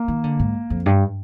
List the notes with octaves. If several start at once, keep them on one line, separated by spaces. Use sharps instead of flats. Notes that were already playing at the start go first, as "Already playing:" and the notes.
Already playing: A#3
D#3
D3
G#2
F2
G2